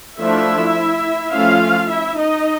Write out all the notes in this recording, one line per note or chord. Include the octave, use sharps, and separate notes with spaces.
F3 A3 D4 E4 E5
F3 A3 C#4 F4 F5
E4 E5
D#4 D#5